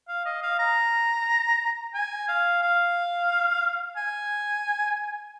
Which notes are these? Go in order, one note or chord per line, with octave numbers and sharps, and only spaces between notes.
F5
D#5
F5
A#5
G#5
F5
F5
G#5